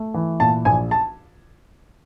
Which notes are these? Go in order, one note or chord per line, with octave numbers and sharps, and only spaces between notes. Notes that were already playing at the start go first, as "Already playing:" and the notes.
Already playing: A3
E3
A#2 A5
A#1 G#5
A5